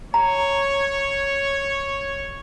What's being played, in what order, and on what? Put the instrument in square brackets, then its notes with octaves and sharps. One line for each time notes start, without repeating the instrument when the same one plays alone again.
[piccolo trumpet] C#5 [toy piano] A#5